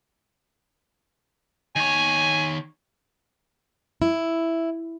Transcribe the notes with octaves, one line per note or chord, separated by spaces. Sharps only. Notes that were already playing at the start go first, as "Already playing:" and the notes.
D#3 C#5 G#5
E4